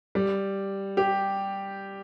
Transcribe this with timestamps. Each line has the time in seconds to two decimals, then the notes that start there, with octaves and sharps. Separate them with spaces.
0.15 G3
0.97 G4